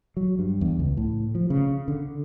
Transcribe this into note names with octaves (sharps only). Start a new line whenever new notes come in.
F#3
G2
E2
C#2
A2
F3
C#3
D3